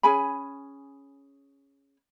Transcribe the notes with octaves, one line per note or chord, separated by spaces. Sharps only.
C#4 G#4 G#5 B5